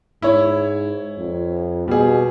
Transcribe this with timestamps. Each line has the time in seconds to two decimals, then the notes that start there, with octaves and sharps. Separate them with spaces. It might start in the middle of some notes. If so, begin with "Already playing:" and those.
0.22 G#2 E4 C#5
1.19 F2
1.88 B2 G3 G#4